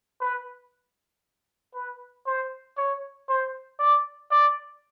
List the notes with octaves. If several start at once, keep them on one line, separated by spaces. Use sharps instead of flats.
B4
B4
C5
C#5
C5
D5
D5